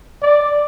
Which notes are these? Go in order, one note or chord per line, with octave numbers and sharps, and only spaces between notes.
D5